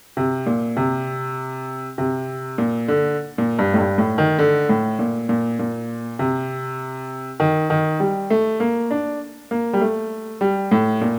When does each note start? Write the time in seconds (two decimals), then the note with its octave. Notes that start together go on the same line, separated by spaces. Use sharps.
0.17 C3
0.46 A#2
0.77 C3
1.98 C3
2.58 A#2
2.88 D3
3.38 A#2
3.59 G2
3.74 A2
3.79 G2
3.98 A2
4.18 D#3
4.39 D3
4.69 A2
4.99 A#2
5.29 A#2
5.59 A#2
6.19 C3
7.40 D#3
7.70 D#3
8.00 G3
8.30 A3
8.60 A#3
8.91 D4
9.51 A#3
9.73 G3
9.81 A3
10.41 G3
10.71 A2
11.01 A#2